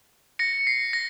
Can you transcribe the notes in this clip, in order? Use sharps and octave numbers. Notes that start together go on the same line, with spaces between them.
A#6 C#7
C7
A#6